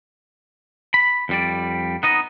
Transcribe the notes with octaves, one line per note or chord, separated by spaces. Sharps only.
B5
F2 G3 D5
B3 D#4 D#5